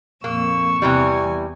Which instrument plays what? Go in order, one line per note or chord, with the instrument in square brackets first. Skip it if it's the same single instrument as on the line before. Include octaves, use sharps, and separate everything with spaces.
[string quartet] F2 A#2 E6 [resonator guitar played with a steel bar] A#3 [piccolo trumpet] C#6
[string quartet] E2 G#5 [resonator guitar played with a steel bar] C3 E3 G3